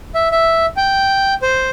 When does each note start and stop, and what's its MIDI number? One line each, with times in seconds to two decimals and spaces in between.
0.15 0.28 76
0.32 0.66 76
0.77 1.34 79
1.42 1.70 72